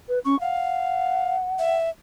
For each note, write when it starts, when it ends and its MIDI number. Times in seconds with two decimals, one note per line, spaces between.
0.08 0.19 71
0.25 0.39 61
0.25 0.39 85
0.40 1.36 77
0.40 1.76 78
1.59 1.89 76